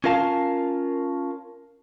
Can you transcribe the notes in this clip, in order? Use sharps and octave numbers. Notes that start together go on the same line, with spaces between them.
C#4 F4 A#4 F5 A5